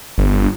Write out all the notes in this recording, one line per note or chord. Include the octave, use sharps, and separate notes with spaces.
G1